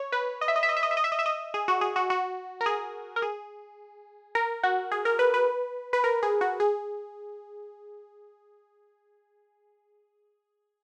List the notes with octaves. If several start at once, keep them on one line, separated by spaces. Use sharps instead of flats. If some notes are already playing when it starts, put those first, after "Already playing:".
Already playing: C#5
B4
D#5
E5
D#5
E5
D#5
E5
D#5
E5
D#5
E5
D#5
E5
D#5
G#4
F#4
G#4
F#4
F#4
A#4
G#4
A#4
G#4
A#4
F#4
G#4
A#4
B4
B4
B4
A#4
G#4
F#4
G#4